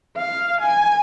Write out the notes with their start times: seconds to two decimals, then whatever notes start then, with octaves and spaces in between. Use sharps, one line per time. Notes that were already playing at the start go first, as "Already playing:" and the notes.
0.17 F5
0.61 G#5